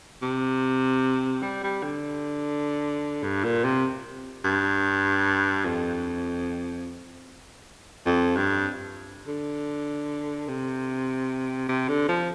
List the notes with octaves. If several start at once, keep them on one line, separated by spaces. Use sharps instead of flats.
C3
G3
G3
D3
G2
A#2
C3
G2
F2
F2
G2
D3
C3
C3
D3
F3